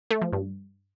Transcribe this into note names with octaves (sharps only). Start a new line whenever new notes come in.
A3
F3
G2